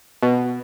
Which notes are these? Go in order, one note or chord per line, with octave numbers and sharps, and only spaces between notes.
B2